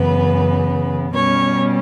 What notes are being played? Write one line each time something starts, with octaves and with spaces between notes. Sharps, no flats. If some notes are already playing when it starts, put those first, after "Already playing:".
Already playing: F#2 C#3 E3 B3 B4
B2 G3 C#4 C#5